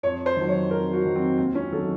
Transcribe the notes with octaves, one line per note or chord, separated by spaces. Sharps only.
F2 C#5
C5
D#3 F#3
C#5
F2 A#4
F#4
D#3 F#3
C4
D#2 C4
C#4
D#3 F#3 A4